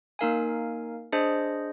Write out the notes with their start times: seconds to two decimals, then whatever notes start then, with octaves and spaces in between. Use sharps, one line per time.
0.19 A#3 D#4 A#4 F5 G#5
1.12 D4 G#4 C5 D#5